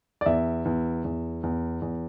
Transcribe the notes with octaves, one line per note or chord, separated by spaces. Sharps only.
D5
E2 E5
E2
E2
E2
E2